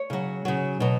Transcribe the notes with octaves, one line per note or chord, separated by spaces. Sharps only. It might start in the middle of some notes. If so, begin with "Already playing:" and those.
Already playing: C#5
C#3 F#3
C#3 F#3
B2 F#3